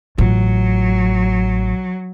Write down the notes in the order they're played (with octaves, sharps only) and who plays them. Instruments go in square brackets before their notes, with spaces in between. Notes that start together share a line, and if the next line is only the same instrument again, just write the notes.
[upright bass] A1 F4 [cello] F#3